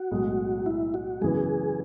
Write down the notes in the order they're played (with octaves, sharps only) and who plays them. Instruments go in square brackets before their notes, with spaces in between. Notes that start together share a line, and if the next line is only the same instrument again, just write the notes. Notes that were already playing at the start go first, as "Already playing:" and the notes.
Already playing: [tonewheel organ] F#4
[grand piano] B1 A2 G#3
[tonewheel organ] E4
F#4
[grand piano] F#2 C#3 E3 B3 [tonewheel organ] G#4